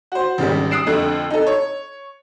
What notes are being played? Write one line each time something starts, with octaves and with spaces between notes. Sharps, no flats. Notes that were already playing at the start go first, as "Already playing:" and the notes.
F#4 C5
G#1 C#3 G3
D#6 E6 F#6 C7 D7 E7
F2 D3 A3
D#4 A4
C#5